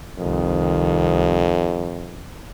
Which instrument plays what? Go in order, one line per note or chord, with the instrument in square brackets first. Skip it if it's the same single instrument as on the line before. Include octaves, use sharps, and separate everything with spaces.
[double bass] C2 D#3 [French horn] F2